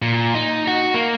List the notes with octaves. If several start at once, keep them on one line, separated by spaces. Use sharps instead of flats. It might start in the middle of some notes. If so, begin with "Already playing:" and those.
A#2
D#4
F#4
A#3